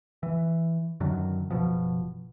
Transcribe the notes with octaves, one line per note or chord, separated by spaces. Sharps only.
E3
F#2 D3 D#3 F#3
F#1 B1 B2 F3